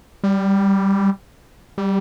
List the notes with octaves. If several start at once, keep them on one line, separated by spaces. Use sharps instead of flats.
G3
G3